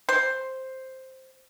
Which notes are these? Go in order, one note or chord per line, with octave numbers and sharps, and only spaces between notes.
C5